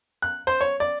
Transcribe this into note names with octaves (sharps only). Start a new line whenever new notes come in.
F#6
C5
C#5
D5